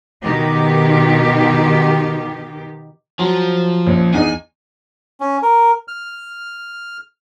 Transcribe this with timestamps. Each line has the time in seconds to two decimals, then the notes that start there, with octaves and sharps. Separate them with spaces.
0.21 B2 D#3 G4
3.19 F3 F#3
3.87 A#1 C#4
4.14 E2 D#4 G#5
5.20 C#4
5.43 A#4
5.88 F6